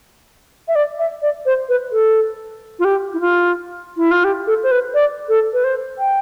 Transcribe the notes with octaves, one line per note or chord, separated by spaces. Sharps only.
E5
D5
E5
D5
C5
B4
A4
F4
G4
E4
F4
E4
F4
G4
A4
C5
B4
D5
A4
B4
C5
G5